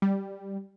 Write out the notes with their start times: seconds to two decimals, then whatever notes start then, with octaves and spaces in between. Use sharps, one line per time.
0.02 G3